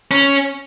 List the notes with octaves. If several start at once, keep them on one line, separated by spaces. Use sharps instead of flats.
C#4